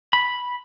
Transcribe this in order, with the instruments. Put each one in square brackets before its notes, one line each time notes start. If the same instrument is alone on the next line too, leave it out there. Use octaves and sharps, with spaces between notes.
[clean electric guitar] B5